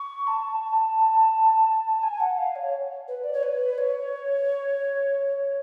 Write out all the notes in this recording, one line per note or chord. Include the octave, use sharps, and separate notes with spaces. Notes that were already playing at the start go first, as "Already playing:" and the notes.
Already playing: C#6
A5
G#5
F#5
F5
C#5
B4
D5
C#5
B4
C#5